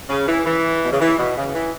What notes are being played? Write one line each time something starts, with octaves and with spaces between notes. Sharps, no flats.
C#3
E3
E3
B2
C#3
E3
B2
C#3
E3